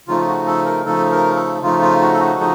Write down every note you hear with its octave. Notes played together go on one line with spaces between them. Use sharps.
C#3 F3 A3 D#4 F4
F#4
A4
A#4
C#3 F3 A3 D#4 A4
A#4
A4
C#3 F3 A3 D#4 F4
F4
F#4
A4
F#4
C#3 F3 A3 D#4